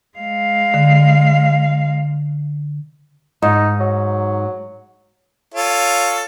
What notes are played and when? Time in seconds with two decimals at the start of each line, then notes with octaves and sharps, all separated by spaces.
0.17 G#3 F5
0.74 D3
3.42 G#2 D#4
3.80 F#3
5.54 F4 A4 C#5